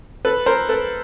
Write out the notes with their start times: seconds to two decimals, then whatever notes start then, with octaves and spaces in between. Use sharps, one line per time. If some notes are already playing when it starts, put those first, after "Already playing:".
0.25 A4 B4
0.46 A#4 C5
0.69 A4 B4